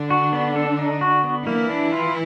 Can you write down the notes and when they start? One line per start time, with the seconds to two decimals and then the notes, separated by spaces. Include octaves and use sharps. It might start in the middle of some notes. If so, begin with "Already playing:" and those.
Already playing: D3 D4
0.10 F#4
0.33 B3
0.56 A4
0.79 D#4
1.01 F#4
1.24 B3
1.46 E3 A#3 E4
1.69 D4
1.92 F4